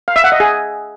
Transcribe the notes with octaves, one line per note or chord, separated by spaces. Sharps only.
F5
E5
F#5
D#5
G#4